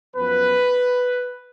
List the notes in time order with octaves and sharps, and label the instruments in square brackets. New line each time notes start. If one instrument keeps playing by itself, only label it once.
[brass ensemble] F#2 F3 B3 B4